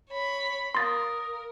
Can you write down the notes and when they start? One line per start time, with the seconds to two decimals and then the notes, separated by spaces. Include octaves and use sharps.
0.10 C#5 B5
0.75 A#4 F5 C6 D#6 A6 A#6